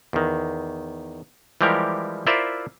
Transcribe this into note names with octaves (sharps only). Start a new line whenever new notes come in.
E2 D#3
E3 F3 G3 G#3 G4 A#4
E4 F4 A#4 C5 D5 E5